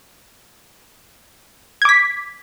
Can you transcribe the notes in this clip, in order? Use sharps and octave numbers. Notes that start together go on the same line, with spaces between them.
D6 G#6 B6